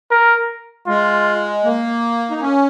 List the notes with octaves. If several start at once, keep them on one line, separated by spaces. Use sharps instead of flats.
A#4
G#3 F4
A#3
D#4
C#4